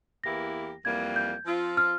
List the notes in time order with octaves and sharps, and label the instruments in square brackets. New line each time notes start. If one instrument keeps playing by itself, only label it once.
[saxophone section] E2 E3 A#3 E4 G4 [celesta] A#6
[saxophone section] F2 E3 G3 A#3 [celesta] G#6
[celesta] G6
[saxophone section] F3 C4 F4
[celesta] F6